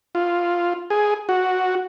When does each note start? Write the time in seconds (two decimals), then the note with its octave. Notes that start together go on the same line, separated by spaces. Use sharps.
0.15 F4
0.90 G#4
1.29 F#4